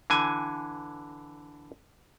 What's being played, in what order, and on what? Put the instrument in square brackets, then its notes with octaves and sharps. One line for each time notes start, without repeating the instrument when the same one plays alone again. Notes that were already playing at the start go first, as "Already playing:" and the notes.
[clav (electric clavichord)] D3 E3 G#5